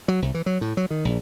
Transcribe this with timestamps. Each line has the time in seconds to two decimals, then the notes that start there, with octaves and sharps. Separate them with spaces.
0.08 F#3
0.22 C2
0.34 E3
0.46 F#3
0.61 A2
0.77 F#3
0.91 D#3
1.05 A#1